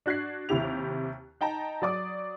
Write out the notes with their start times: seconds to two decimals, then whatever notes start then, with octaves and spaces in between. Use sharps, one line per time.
0.06 D4 F#4 F#6 G#6 C7
0.49 D#2 C3 E4 G4 F7
1.41 D#4 G5 A5 A#5
1.82 F#3 D5 D6 D#6